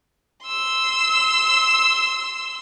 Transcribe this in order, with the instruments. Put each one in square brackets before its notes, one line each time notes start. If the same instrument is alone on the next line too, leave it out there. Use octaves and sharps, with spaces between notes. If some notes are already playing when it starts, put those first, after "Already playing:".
[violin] C6 E6